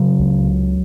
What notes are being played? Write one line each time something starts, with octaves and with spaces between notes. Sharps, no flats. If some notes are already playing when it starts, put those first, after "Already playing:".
Already playing: C#3 F#3
C#2